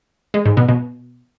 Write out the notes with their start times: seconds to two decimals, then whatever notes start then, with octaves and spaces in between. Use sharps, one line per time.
0.34 G#3
0.45 G#2
0.57 B2
0.69 B2